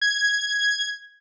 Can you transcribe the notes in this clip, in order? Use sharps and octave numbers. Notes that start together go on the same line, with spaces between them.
G#6